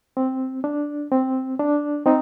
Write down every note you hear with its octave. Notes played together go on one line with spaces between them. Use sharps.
C4
D4
C4
D4
C4 D#4